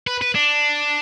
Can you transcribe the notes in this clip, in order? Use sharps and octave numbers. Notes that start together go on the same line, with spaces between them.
B4
B4
D4